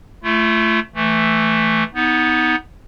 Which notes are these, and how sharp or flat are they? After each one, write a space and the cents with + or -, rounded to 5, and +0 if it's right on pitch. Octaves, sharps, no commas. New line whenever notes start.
A3 +5 F4 -40
E3 +0 A3 +0
B3 +0 D#4 +20